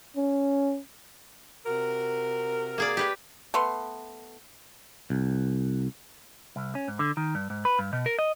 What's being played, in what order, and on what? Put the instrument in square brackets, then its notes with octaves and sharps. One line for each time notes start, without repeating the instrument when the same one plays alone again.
[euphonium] C#4
[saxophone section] C3 F#4 A#4
[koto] A#3 G#4 D5
G4 B4 G5
[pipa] A3 B3 C6
[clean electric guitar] C2
C2
C#4
G#2
D3
D#3
G2
G#2
B4
G2
B2
A#4
D#5